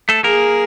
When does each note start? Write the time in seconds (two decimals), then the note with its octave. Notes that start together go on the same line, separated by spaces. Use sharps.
0.09 A3 A4
0.24 A#3 G#4 A#4